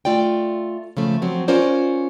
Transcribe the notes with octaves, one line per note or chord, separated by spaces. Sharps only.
A3 F4 D5 G5
C#3 F3 A3
F3 F#3 C4
C#4 F4 A#4 C5 D5